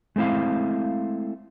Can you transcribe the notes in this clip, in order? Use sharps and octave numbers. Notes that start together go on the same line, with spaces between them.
G#3 A3 C4 E4 F5